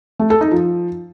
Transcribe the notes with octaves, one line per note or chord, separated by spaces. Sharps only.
A3
A4
D#4
F3